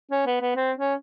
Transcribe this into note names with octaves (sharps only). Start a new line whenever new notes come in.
C#4
B3
B3
C4
C#4